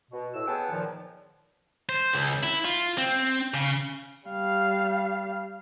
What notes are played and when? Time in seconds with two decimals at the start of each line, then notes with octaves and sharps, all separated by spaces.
0.11 B2
0.34 A2 E6
0.47 B3 G#4 C#5 F#5 G5 A5
0.71 A#2 D#3 F3
1.89 C5
2.14 C#2
2.43 E4
2.65 F4
2.98 C4
3.54 C#3
4.28 G3 F5